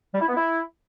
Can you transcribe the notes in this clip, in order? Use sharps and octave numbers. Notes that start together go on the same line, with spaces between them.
G3
E4
B3
E4